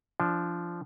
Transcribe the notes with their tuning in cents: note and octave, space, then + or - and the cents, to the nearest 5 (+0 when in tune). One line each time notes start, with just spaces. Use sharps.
F3 -15 D4 +0